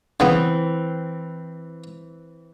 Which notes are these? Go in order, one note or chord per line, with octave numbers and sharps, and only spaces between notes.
C#3 E3 B3 C4